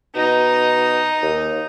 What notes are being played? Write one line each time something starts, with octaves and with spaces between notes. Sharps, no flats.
B2 D#4
D#2